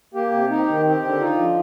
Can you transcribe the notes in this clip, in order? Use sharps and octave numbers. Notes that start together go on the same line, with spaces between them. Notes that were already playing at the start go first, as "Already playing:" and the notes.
A#3 G4
C3
D#4 G4
D#3
C4 G4
D3
D#4 F4
F3